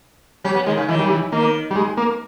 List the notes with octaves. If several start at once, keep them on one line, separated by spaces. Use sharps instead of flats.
G3 C#4
B3
D#3 G#3
C#3
D#3 E3
G3
E3
D#3 A#3
G3
G#3
A#3